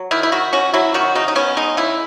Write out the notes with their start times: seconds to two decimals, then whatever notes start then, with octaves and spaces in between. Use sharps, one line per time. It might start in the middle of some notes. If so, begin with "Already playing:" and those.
Already playing: F#3
0.11 D#3 E4
0.23 E4
0.32 D#3 F#4
0.53 C#4 F#4
0.74 F#3 E4
0.94 D#3 F#4
1.15 C#3 D#4
1.28 D#4
1.35 B3 C#4
1.57 G#3 D#4
1.77 C#3 E4